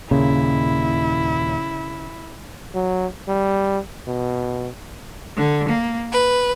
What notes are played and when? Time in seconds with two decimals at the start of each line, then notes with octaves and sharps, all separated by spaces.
0.11 D#2 A#2 C#3 E4
2.74 F#3
3.28 G3
4.07 B2
5.36 D3
5.68 A#3
6.12 B4